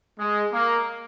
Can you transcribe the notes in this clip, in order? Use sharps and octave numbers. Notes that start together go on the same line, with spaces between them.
G#3
A#3